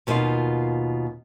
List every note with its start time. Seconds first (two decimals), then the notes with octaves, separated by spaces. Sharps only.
0.07 D#2 B2 A#3 D#4 F4 F5